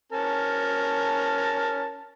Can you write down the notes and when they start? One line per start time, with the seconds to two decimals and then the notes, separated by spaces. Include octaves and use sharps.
0.12 C#4 A#4 A5